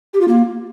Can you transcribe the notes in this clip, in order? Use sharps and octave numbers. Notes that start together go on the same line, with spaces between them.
G4
F4
A#3